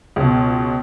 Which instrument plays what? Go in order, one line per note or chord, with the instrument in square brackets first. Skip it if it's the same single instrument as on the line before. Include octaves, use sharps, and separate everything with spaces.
[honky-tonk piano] C#2 B2